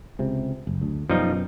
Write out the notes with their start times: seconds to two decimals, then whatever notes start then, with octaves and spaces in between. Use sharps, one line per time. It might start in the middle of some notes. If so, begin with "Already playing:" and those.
0.19 C#2 C3
0.67 F#1
0.81 D2
1.10 F#2 B2 F3 G3 D#4